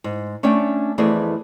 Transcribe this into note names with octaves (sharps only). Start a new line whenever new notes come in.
G#2
A3 C#4 D4 D5 G5
F2 E3 A3 B3 G#4 D5